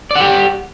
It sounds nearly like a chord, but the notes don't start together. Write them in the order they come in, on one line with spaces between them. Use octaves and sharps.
D5 F#5 G4